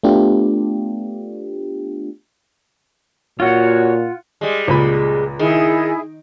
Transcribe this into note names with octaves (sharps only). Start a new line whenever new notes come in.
A3 B3 D4 F4 G4
A#2 F4 F#4 C#5 F#5
G3 G#3
C#2 A#2 B5
D#3 E4 G#4